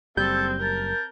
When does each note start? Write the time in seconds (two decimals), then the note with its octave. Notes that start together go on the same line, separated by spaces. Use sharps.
0.17 F#1 G3 C4 A4 G6
0.63 A#4 A5